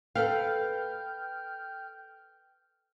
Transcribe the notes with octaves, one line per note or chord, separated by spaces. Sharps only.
A4 B4 F5 G5 F6 G6